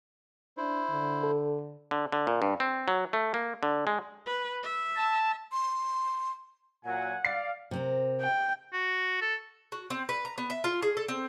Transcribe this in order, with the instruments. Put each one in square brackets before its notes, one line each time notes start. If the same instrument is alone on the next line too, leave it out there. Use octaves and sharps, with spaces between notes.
[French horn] D4 [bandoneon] E4 C5
[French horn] D3
[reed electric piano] A4
[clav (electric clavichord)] D3
D3
A#2
G2
C4
F#3
A3
A#3
D3
G#3
[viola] B4
E5
[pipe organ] A5
[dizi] C6
[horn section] A#2 F#3 [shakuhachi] F#5 [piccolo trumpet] G#5
[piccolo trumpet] D5 [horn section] F5 [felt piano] A6 C7
[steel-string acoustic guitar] C3 C4 A#4
[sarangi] G5
[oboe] F#4
A4
[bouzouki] F#4
C4
B4
A#5
B3
E5
F4
G#4
A4
C4